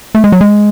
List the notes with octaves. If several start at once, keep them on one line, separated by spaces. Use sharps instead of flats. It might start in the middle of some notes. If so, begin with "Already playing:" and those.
A3
G#3
F#3
G#3